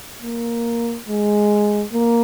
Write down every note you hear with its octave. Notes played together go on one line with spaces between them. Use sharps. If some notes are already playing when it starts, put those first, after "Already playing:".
A#3
G#3
A#3